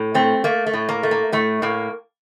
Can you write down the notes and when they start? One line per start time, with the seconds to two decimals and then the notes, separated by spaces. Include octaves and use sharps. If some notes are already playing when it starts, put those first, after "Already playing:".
Already playing: A2
0.14 A3 C4
0.44 A3 A#3
0.66 A3
0.73 A2
0.89 A#3
1.03 A3
1.11 A#3
1.32 A2 A3
1.62 A2 A#3